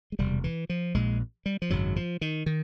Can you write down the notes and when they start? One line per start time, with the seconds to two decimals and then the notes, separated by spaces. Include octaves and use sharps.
0.12 G#3
0.19 E1 D2 C3 G3
0.44 E3
0.70 F3
0.94 A#1 A#2 G#3
1.46 G3
1.62 F3
1.70 G#1 F#2 C#3 F#3
1.96 F3
2.21 D#3
2.46 D#3